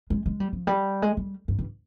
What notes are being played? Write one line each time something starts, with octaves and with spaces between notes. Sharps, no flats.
G#3
G#3
G3
F3
G3
G#3
G3
G2
G2